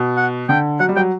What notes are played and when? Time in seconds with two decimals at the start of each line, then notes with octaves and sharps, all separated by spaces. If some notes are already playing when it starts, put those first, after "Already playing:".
Already playing: B2
0.17 F#5
0.49 D3 G5
0.80 F#3 F#5
0.89 G3
0.96 F#3 G5